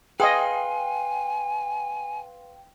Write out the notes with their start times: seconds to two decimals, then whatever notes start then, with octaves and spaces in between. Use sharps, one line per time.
0.20 G#4 B4 D#5 F5 G5 G#5 C6